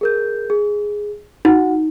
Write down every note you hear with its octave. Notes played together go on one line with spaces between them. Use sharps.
G#4 A#4 G6
G#4
D#4 F#4 F#5